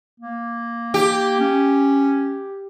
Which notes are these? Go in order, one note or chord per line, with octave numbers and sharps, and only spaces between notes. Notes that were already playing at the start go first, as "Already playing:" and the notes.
A#3
G4
C#4